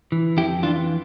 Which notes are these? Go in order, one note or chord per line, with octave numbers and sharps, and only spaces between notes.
E3
F2 E4 G4
E3 D4 F4